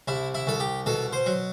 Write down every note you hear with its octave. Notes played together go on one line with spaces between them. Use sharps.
C2 E4
E4
C2 A4
G4
B2 A4
C5
F#3